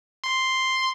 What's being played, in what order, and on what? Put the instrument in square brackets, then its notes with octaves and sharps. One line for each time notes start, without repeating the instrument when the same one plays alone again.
[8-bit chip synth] C6